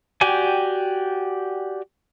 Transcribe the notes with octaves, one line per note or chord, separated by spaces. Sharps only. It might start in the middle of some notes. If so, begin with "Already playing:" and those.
F#4 G4 D5 G5 G#5